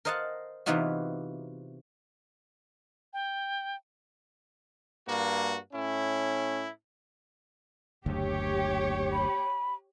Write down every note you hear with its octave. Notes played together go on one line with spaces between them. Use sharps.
A#4 C5 D#5 F5 F#5 A5
C3 E3 B3 D#4 F4 F#4
G5
G2 A#3 F#4
A2 C#4 E4
F#1 D2 G4 C#5
B5